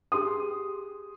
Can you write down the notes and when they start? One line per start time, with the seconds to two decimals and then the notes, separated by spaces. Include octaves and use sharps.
0.12 G4 G#4 C6 D#6